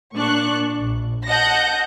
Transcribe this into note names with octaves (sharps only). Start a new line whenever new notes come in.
A#2 D4 C#6 F#6
A#1
D#5 F#5 A5 G6 A#6 C#7